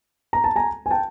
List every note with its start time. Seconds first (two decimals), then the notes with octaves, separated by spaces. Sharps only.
0.33 A#5
0.44 A5
0.56 G#5 A#5
0.86 G#5
0.91 G5 A5